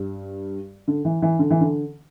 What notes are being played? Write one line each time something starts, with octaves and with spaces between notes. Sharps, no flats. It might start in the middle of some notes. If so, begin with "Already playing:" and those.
Already playing: G2
D3
E3
E3
D3
E3
D3